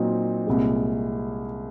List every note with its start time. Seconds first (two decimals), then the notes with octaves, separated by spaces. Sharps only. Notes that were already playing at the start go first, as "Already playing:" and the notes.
Already playing: A#2 F#3 C4 D#4
0.47 C2 A#2 G#3